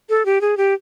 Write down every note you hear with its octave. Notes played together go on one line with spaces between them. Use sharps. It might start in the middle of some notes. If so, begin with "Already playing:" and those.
A4
G4
G#4
G4